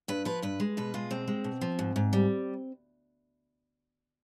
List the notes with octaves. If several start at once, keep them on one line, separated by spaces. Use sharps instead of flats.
G2 B4
F3 B4
G2 B4
G#3
B2 B4
G#3 F4
B2 C4
G#3
B2
F3
G#2
G#2
G3